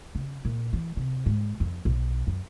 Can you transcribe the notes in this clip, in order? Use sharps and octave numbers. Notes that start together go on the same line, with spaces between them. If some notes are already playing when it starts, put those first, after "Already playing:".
C#3
A#2
E3
C3
G#2
F2
B1
F#2